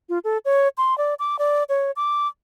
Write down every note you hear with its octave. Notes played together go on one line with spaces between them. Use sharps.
F4
A4
C#5
C6
D5
D6
D5
C#5
D6